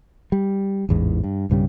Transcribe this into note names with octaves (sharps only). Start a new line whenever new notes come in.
G3
A1 E2 G#2
G2
B1 G2 C#3 G3